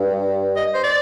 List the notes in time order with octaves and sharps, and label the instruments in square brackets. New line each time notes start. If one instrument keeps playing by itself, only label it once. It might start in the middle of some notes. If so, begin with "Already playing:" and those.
Already playing: [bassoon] G2
[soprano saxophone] D#5
C5
D5